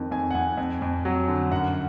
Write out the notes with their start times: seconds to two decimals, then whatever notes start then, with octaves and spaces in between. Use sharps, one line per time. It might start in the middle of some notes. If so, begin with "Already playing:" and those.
Already playing: F2 D#3
0.11 F2 G#5
0.31 F#5
0.35 F2 G#5
0.58 F2
0.82 F2
1.05 F#3
1.28 D3
1.51 F#2 F#5